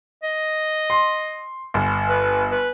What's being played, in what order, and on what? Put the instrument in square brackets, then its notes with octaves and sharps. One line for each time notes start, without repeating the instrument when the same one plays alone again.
[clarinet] D#5
[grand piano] C6
G1
[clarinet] B4
B4